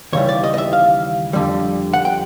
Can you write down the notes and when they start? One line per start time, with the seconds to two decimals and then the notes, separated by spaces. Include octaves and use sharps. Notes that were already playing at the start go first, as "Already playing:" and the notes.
0.13 D#2 C#3 E3 G3 C#5
0.29 D5
0.44 D#5
0.54 D#5
0.58 E5
0.73 F5
1.33 F2 D3 G3
1.93 F#5
2.05 G5